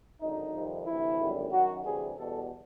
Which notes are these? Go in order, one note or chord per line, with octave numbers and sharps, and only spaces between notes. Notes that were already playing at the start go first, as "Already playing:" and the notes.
G#1 F#2 D3 D#4
F2 C3 D#3 G3
D2 C3 E3 E4
G#1 F#2 D3 G3
F#2 D#3 F#3 F#4
D2 C3 E3 G3 G#4
E2 B2 G3 A4